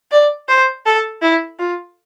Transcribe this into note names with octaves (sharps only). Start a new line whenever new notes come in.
D5
C5
A4
E4
F4